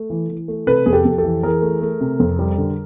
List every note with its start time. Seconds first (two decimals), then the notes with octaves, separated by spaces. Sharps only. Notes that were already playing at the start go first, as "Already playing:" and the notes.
Already playing: A3
0.10 E3
0.29 E3
0.48 A3
0.67 C3 A4 B4
0.86 F2 G#4
0.93 G4 A4
1.05 F2
1.18 G4 A4
1.24 E3
1.43 E3 G#4 A#4
1.62 A3
1.81 A3
2.01 C3
2.20 F2
2.39 G3
2.58 D3